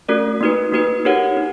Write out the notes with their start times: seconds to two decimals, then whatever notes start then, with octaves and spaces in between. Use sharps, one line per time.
0.09 A3 C#4 F#4 A#4 D5
0.41 A#3 D#4 F#4 B4
0.72 A#3 D#4 F#4 B4
1.05 D#4 G4 A#4 C#5 F#5
1.37 D#4